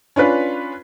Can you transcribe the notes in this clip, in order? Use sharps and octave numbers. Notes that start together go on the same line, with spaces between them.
C#4 D4 F4 B4